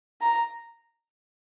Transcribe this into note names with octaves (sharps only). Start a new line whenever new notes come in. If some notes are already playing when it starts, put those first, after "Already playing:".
A#5